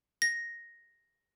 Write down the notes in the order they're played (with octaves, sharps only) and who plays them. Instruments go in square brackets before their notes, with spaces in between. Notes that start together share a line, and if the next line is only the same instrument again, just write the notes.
[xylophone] A#6